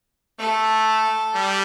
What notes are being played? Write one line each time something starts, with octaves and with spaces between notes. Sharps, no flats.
A3 A4
G3